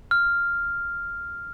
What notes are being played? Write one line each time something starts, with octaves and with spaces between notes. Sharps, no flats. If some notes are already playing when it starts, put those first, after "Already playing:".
F6